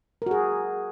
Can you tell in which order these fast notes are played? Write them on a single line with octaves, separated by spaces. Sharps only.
A#4 F#4 G#4